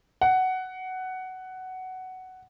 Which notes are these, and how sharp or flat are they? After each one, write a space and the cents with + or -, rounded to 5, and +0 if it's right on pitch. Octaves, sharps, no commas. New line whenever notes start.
F#5 +10